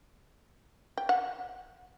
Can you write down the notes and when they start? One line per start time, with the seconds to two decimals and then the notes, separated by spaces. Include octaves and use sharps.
0.97 G5
1.09 F#5